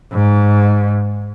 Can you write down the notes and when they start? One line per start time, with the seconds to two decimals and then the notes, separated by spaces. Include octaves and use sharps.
0.12 G#2